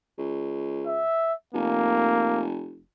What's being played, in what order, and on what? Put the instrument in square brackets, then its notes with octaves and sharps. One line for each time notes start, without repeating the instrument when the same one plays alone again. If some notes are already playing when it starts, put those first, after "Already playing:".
[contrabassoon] C#2
[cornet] E5
[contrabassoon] F1 [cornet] A#3